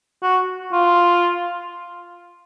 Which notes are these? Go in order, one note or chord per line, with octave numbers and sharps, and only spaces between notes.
F#4
F4